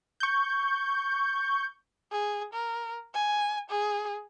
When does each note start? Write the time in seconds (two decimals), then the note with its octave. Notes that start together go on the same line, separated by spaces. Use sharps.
0.20 C#6 G6
2.11 G#4
2.53 A#4
3.14 G#5
3.70 G#4